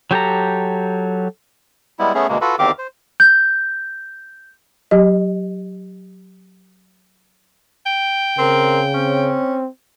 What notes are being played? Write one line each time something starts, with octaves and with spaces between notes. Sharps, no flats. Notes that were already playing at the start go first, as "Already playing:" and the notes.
F#3 G4 A4 A#5
G3 G#3 B3 E4
A3 B3 C#4 G#4
D2 B2 G#3 A#3
F4 F#4 A4 B4
E2 D#3 C4 G4 F5 D6
C5
G6
F#3 G4 D#5
G5
C#3 C4 A#4
C4 C#4